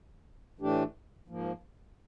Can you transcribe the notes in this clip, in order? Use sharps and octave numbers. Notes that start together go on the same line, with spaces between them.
A2 E3 A3 D4 G4
G#2 F3 A#3